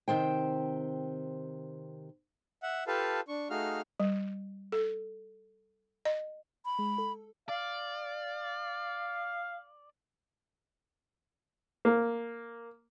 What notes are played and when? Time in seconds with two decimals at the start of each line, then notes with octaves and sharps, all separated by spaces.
0.08 C3 D#3 C5 G5
2.63 E5 F#5
2.87 F4 G4 A4 B4 F5 A5
3.28 D4 C#6
3.50 A3 D#4 F#4 G#4 F5 F6
4.00 G3
4.72 A4
6.05 D#5
6.65 B5
6.79 G#3
6.98 A4
7.49 D5 F5
11.85 A#3